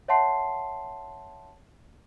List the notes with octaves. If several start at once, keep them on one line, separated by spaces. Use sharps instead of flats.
C#5 E5 F#5 A5 C6 C7